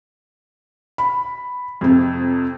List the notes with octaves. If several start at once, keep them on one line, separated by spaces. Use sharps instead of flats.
B5
F2 C3